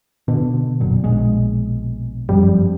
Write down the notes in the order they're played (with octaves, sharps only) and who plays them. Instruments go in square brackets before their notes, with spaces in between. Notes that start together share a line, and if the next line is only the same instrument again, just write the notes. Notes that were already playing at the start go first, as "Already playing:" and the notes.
[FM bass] B2 [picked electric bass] D3
[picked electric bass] F#1 F#2 A#2
A#1 G#3
[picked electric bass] G1 F#2 F3 [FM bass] G3